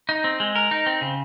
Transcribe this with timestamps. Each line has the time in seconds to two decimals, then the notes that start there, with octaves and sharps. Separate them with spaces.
0.09 D#4
0.24 C4
0.40 G#3
0.56 A#4
0.71 D#4
0.86 C4
1.01 C#3